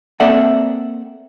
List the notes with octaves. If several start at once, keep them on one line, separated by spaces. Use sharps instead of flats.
A#3 C4 A4 D5 E5 F#5